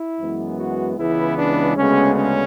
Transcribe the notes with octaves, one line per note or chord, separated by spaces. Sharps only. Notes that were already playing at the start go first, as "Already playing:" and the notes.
Already playing: E4
F#2 E3 G#3 B3
F#4
C#2 C#3 E3 G#3 B3 E4
D4
D2 C#3 G#3 B3 C#4
C#4